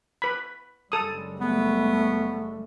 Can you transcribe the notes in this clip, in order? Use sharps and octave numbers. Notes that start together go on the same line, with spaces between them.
B4 B5
F#1 G3 G#3 A4 D#6
A3 B3